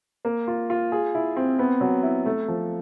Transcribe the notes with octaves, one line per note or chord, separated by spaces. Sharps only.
A#3
F4
F4
G#4
E4
C4
B3
F#3
E4
A3
F3